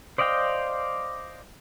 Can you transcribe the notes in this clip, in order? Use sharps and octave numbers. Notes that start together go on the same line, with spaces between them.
C5 D5 D#5 F5 G5